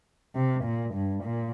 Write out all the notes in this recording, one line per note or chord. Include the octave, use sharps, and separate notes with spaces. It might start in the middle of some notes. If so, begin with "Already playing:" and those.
C3
A#2
G2
A#2